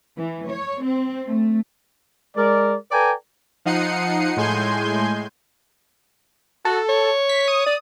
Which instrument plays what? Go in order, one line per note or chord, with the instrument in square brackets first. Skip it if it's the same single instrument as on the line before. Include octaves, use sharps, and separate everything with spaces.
[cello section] E3
C#5
C4
A3
[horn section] G#3 A#4 D5
A4 B4 D5 G5 G#5 A#5
[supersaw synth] F3 D#4 F#5 C7 C#7 D#7
A2 G#3 G#5 C6 G6
[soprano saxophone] F#4 [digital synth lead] A4
[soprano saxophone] C#5
[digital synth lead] B6
D#6
[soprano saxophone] D5